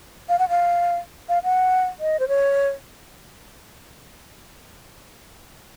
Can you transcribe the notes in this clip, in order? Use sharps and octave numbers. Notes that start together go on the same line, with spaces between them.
F5
F#5
F5
F5
F#5
D#5
C5
C#5